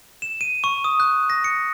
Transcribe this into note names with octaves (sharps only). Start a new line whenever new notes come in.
E7
D#7
C#6
D#6
F#6
A#6
C#7